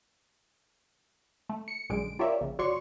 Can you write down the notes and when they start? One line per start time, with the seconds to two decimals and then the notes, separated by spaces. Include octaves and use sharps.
1.49 A3
1.68 C#7
1.90 A#1 F#2 D3 G#3 D7
2.19 F4 G4 A#4 C#5 D5 E5
2.41 A#1 C#3
2.59 G1 F#4 C#5 D5 C6 C#6